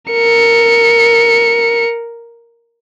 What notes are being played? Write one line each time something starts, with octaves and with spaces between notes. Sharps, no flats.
A#4 C#7